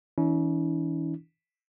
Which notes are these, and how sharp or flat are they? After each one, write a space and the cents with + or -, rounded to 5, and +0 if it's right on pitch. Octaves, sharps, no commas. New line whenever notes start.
E3 -25 C#4 +35 E4 -40